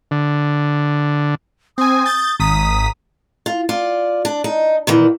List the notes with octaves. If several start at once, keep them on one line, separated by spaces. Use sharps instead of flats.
D3
C4 G#5 D#6
G6 A6
G#1 A#5 D#6 B6
F4
F4 D5
D4
D#4
A#2 D#3 E3